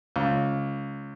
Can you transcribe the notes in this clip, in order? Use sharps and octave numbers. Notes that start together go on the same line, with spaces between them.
C#2